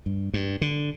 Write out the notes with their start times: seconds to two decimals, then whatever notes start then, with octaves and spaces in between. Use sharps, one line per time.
0.06 G2
0.34 G2
0.61 D3